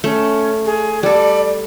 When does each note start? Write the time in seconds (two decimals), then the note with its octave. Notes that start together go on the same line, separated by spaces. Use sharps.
0.04 A3 C#4
0.66 G#4
1.03 G3 A4 D5